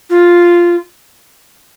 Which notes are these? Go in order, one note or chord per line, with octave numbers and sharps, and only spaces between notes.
F4